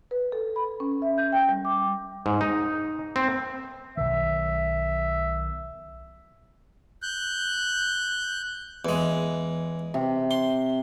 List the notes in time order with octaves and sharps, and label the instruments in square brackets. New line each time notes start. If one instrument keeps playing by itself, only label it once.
[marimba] B4
A4
B5
C#4
E5
G6
G5
G3
D6
[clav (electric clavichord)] G#2
D#4
C4
[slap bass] B1 D#3 [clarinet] E5
[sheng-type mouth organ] F#6 G6
[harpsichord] E2 G#3
[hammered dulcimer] C3
[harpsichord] C6